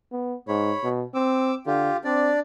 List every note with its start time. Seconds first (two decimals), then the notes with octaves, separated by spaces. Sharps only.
0.12 B3
0.48 G#2 C#5 B5
0.84 B2
1.14 C4 D6 E6
1.66 D3 F4 G4
2.05 C4 D4 D5